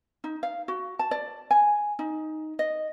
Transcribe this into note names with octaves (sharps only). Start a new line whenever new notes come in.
D#4
F5
F#4
A5
D5
G#5
D#4
D#5